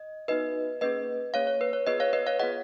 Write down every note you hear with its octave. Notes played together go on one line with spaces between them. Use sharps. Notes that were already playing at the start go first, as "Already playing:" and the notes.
Already playing: D#5
B3 D#4 F#4 B4 D#5
A#3 C#4 G#4 B4 D#5
A#3 C#4 G#4 C#5 F5
C#5
B4
C#5
B3 F4 G#4 B4 D#5
C#5 F5
B4 D#5
C#5 F5
B3 F4 G#4 D#5 F#5